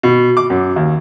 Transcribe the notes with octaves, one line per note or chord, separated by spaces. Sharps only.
B2
D6
F#2
D#2